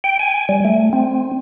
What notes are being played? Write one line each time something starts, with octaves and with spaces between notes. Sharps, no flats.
G5
G#5
G3
A3
C4